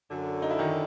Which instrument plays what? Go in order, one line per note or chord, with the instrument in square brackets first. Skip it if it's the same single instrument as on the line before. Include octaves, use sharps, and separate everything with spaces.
[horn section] F#2 D3 F#3
[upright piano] D#4
E4
D#3 D#4